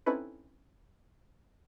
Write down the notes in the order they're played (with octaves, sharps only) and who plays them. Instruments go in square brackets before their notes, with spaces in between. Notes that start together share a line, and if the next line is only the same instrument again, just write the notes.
[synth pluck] C4 C#4 D#4 E4 A4 B4